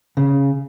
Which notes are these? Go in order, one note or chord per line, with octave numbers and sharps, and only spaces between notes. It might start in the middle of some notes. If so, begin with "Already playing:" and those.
C#3